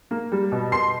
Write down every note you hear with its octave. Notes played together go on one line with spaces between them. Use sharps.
A#3
G3
B2
B2 C6 C7